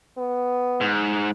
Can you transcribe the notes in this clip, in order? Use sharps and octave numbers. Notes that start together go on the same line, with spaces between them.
B3
G#2